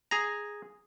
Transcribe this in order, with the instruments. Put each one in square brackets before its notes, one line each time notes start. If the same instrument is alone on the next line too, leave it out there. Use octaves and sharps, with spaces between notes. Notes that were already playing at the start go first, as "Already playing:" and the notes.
[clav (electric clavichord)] G#4 A#5